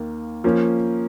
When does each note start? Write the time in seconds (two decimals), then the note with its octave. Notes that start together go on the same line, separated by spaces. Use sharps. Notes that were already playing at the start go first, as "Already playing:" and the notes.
Already playing: D#2 D#3 A#3
0.44 F3 A#3 C#4